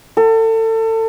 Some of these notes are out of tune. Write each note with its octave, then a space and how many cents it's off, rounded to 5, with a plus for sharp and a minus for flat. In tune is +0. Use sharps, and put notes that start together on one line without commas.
A4 +30